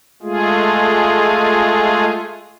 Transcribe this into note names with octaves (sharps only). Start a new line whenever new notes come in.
G#3 A3 F4 G#4